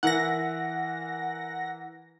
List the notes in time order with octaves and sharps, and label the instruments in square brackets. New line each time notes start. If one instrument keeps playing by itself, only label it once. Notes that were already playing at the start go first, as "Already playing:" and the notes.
[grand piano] E3 E4 A#4 [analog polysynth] F#5 A#6